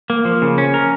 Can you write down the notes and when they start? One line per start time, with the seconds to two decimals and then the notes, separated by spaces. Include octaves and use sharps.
0.10 A#3
0.25 F3
0.42 C#3
0.58 C#4
0.74 A#4